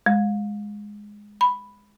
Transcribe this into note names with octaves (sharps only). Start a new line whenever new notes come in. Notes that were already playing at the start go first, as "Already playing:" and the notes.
G#3
B5